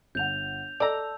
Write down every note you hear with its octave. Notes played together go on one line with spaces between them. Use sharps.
G1 F#5 G6 F7
A4 D5 D#5 A5 A#5 E6